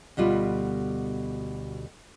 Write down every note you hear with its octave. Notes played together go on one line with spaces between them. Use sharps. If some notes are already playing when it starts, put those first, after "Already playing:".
D2 B2 G3 F4